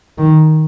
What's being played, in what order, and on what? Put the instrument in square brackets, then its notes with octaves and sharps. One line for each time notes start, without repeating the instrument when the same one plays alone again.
[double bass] D#3